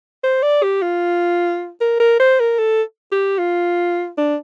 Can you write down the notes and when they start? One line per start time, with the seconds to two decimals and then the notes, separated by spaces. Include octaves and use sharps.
0.24 C5
0.43 D5
0.63 G4
0.82 F4
1.81 A#4
2.00 A#4
2.20 C5
2.40 A#4
2.59 A4
3.12 G4
3.39 F4
4.18 D4